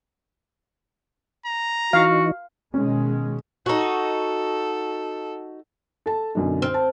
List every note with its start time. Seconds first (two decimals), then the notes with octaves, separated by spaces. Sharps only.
1.46 A#5
1.93 E3 D#4 F#4 F5
2.74 B2 D#3 G#3 C#4
3.66 D#4 F#4 A4
6.06 A4 A5
6.35 B1 F#2 D3
6.62 C4 F6
6.74 A5